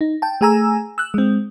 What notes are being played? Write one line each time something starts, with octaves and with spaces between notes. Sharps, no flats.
D#4
G5 A5
A3 G#4 G#5 A#5 E6
E6 F#6
G#3 C4